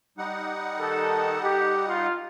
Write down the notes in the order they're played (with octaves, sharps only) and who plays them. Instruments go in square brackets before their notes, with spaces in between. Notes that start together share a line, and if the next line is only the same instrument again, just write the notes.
[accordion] G3 D#4 F#5
[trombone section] D#3 A4
G4
F4